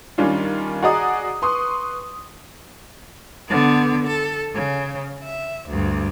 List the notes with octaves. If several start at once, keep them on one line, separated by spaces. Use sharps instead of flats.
D#3 G3 C#4 D4 F4
F#4 G#4 D5 D#5 A#5 D#6
B4 C6 C#6 D#6
D3 B3
A4
C#3
E5
D2 G2